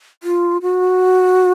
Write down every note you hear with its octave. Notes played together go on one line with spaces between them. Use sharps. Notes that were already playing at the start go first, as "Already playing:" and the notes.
F4
F#4